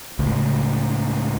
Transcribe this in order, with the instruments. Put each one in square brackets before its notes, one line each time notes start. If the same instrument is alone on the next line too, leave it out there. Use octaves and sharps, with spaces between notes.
[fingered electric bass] C#2 A2